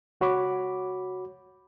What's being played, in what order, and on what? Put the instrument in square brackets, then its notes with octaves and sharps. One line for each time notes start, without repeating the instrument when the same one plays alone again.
[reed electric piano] C#2 F#4 C#5 B5 D6